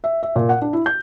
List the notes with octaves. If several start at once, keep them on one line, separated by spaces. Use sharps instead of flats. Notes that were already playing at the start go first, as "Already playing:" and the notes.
E5
E5
A#2
F#5
D4
E4
G6